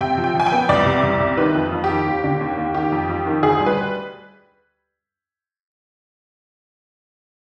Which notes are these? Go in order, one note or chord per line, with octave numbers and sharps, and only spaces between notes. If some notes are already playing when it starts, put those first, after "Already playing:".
C3 G5
F3
G5
F3 G#5
G5
B3
C2 D5
C3
C2
C3
D#3 B4
F2
F2
G4
D#3
D#2
D3
D#2
D#2
D#3 G4
F2
F2
D#3
D2 G#4
G3
B4